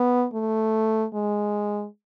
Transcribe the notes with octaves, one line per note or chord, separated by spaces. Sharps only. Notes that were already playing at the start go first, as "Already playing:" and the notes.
Already playing: B3
A3
G#3